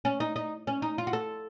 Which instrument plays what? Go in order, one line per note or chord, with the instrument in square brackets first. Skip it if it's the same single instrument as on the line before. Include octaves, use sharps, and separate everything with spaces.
[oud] C#4
D#4
D#4
C#4
D#4
F4
F#4
A4